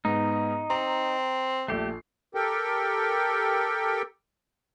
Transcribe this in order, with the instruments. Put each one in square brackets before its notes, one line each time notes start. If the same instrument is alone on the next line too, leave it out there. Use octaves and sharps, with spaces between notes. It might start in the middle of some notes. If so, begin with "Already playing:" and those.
[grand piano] G#2 B3 [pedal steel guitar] D#4
[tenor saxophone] C4 [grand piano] A#5
[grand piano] A#1 A4 C7 [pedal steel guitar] A3 G4
[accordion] G4 A4 A#4 G5